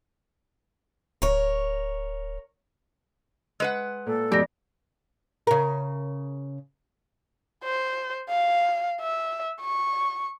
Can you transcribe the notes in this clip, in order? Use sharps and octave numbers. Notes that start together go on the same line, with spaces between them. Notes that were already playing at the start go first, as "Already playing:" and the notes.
D1 A#4 C#5
G#3 B4 F#5
A#2 A4
F2 G#2 B2 G4 D5 A#6
C#3 A#4
C5
F5
E5
C#6